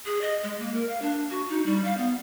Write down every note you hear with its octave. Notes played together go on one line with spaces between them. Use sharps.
G#4
D#5
G#3
A#3
A#4
F5
D4
F#4
D#4
G3
F5
B3